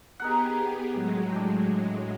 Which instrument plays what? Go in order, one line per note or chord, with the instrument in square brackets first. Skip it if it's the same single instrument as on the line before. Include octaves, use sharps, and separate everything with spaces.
[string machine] B3 G4 G#4 [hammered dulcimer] D#4 A#4 F#5
[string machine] A2 F#3 G#3
[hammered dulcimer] D4 G5